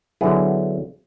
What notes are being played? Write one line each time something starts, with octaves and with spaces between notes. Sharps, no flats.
D3 F#3 B3 E4 G#4